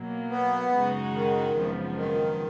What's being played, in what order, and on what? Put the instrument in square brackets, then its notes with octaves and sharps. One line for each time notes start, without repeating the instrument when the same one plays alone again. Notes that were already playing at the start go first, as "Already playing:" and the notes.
Already playing: [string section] B2 F#3 A#3
[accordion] B3
[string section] F#2 C#3 G#3 D#4 F#4
[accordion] D#3
[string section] G#1 F#2 C#3 F3 B3
[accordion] D#3